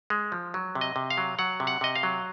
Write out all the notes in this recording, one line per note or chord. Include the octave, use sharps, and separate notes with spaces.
G#3
F3
F#3
C3
D#5
C3
F5
F#3
F#3 F#5
C3
F#5
C3 D#5
F5
F#3